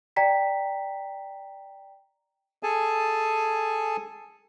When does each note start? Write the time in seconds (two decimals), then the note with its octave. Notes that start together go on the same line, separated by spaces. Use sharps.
0.16 D5 G5 A#5 B6
2.63 G#4 A4 G#5 A5